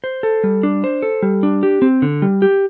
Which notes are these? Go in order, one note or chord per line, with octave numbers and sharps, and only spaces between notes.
C5
A4
G3
D4
C5
A4
G3
D4
G4
C4
D3
G3
G4